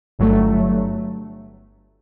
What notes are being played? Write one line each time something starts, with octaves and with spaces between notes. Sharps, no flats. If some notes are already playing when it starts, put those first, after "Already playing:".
G1 G2 F#3 A3